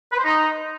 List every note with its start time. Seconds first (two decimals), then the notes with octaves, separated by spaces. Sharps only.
0.12 B4
0.18 C5
0.24 D#4